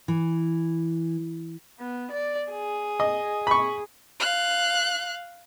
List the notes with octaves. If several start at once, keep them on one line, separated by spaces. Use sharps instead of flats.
E3
B3
D5
G#4
D#5
B5 C#6
F5 F#6